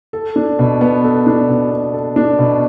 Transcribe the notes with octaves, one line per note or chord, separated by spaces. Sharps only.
A4
D4
B2
B3
A4
D4
B2
B3
A4
D4
B2